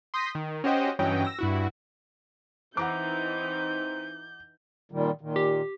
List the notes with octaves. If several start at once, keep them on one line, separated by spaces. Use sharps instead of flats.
C6 D#6 G6 A#6 B6
D#3
C#4 F#4 G4 C5 D#5 G5
G2 E3 F#3 C#4 D#5 G5
E6 A#6
G2 E4 F#4
E3 C4 D#4 F#5 A#5 D6 G6
A#2 D#3 G3
A#2 D#3
G4